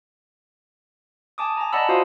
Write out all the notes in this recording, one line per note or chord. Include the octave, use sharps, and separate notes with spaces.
G#5 A5 D6 D#6
G#5 A#5
D5 D#5 F#5 A5 B5 E6
F4 F#4 C5 F5 D#6